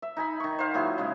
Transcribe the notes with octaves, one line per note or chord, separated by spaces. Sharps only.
E5
D#4 G#5 B5
D#3 C#6
C5 F5
A#2 F#3 E4 G#4
C#3 G#3